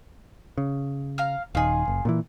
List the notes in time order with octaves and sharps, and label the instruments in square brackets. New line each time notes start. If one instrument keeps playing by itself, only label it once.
[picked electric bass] C#3
[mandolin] F5 A#5 F6
[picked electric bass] D#1 D#3 [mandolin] F4 G#4
[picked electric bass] F#1
A#2 D3 E3